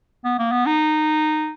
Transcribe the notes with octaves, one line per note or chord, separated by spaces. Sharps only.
B3
A#3
B3
D#4